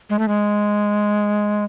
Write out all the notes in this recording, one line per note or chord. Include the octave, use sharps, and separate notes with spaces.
G#3
A3
G#3